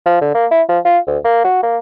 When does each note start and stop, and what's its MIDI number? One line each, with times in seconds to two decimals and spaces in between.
0.06 0.18 53
0.21 0.33 50
0.35 0.46 58
0.51 0.62 64
0.69 0.79 53
0.85 0.98 65
1.07 1.17 38
1.24 1.43 58
1.44 1.61 66
1.63 1.77 58